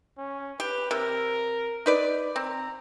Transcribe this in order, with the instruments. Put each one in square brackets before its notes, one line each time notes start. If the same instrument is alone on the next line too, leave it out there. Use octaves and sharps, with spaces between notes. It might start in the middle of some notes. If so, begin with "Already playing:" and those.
[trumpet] C#4
[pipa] G4 [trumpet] B4
[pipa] C3 [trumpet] A#4
[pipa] D#4 B4 D5
[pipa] C4 [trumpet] A#5